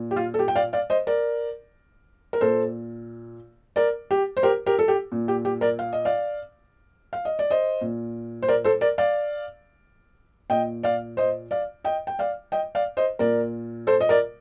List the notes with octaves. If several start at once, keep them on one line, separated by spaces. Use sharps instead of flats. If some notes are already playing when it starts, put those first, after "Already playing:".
Already playing: A#2
G4
F4
A4
G4
G5
D5 F5
D5 F5
C5 D#5
A#4 D5
A#4
A#2 A4 C5
A#4 D5
G4
C5
G4 A#4
G4 A#4
A4
G4
A#2
G4
G4
A#4 D5
F5
D#5
D5 F5
F5
D#5
D5
C5 D#5
A#2
C5
A#4 D5
A4 C5
A#4 D5
D5 F5
A#2 D#5 G5
D5 F5
C5 D#5
D5 F5
D#5 G5
G5
D5 F5
D#5 G5
D5 F5
C5 D#5
A#2 A#4 D5
A4 C5
D#5
A#4 D5